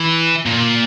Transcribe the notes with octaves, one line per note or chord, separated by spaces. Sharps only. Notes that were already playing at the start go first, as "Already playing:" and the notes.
Already playing: E3
A#2